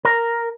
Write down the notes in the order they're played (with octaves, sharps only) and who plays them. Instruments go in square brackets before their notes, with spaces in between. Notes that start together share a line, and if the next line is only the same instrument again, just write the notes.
[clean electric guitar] A#4